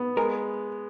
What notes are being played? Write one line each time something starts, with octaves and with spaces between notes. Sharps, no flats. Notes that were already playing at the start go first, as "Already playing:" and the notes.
Already playing: B3
G#3 A#4